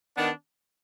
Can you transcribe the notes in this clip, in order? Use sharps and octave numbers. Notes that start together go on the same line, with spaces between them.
D#3 B3 D4